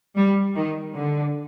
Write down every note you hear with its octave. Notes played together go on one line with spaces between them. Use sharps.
G3
D#3
D3